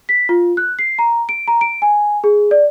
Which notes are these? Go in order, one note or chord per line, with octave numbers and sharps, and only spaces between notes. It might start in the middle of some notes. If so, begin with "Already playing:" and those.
B6
F4
F#6
C7
A#5
D7
A#5
D7
G#5
G#4
D5